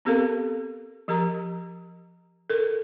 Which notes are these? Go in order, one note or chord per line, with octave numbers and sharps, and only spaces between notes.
B3 C4 G4 A4 A#4 F5
F3 G4 A#4 A#5
A4 A#4